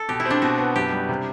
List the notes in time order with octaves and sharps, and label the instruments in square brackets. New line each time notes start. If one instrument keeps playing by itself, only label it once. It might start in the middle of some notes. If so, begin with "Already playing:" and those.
Already playing: [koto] A4
[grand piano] B2 [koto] G4
[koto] E4
[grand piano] C4 [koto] D4
[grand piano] B2 [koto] F#4
[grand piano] B3
[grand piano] F#2 [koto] G4
[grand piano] G3
C3